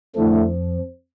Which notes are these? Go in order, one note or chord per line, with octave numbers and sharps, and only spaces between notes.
F2 D3 F3 A3 E4 A4